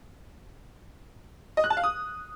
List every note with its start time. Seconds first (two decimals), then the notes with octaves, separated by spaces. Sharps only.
1.57 D#5
1.64 F#6
1.70 A5
1.77 F5
1.84 D#6